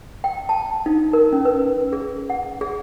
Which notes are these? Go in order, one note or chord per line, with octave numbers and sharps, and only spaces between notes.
G5
A5
D#4
A#4
C#4
B4
G#4
F#5
G#4